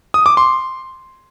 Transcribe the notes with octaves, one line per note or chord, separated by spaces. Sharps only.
D#6
D6
C6